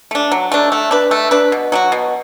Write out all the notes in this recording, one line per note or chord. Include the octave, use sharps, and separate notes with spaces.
A3 D4
F#3
A3 D4
A3
D4 B4
A3
D4 B4
B2
F#3 D4 F#4
B2